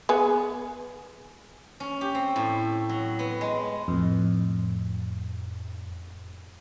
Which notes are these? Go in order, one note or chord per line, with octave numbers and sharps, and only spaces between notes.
B3 G#4
C#4
G4
C4
A2
F#3
B3
G#3
F2 A2